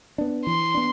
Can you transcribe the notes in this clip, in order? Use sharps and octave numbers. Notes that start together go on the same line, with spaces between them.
B3 D4
E3 C6
B3 D4